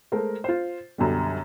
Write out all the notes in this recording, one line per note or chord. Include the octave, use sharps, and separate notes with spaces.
G#3 A3 A#4 C5
F4 C5
B1 F#2 D3 G3